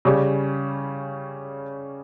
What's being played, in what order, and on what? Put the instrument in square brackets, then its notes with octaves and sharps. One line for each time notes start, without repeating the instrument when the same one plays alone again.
[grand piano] C#3 G3 C#4 G4